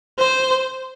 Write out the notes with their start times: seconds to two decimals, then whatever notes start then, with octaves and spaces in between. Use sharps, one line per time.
0.19 C5